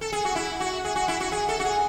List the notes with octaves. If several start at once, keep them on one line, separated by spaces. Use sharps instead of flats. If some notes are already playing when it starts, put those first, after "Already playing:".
A4
G#4
F#4
E4
F#4
G#4
F#4
E4
F#4
G#4
A4
F#4
G#4